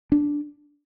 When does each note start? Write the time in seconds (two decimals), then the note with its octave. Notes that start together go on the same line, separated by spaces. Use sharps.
0.12 D4